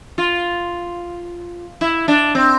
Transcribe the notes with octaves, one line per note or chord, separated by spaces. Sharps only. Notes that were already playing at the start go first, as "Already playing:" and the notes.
F4
E4
D4
C4